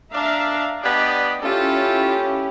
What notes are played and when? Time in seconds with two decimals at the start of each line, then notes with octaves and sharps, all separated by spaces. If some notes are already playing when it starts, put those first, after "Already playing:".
0.13 D4 E5 F5 A#5
0.83 B3 D4 G4 D5 D#5
1.42 C#4 E4 F4 G4 A4